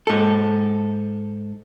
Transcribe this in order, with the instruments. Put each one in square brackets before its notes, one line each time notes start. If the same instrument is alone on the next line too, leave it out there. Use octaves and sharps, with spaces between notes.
[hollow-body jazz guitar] G#2 A4